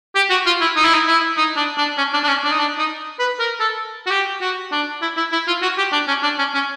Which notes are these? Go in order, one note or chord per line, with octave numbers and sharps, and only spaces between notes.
G4
F#4
F4
E4
D#4
E4
D#4
E4
D#4
D4
D4
C#4
D4
D4
C#4
D4
D#4
D4
D#4
B4
A#4
A4
F#4
G4
F#4
D4
E4
E4
E4
F4
F#4
G4
D4
C#4
D4
C#4
C#4